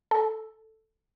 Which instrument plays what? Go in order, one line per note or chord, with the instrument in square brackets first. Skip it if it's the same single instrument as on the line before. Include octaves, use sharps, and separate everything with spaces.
[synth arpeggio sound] A4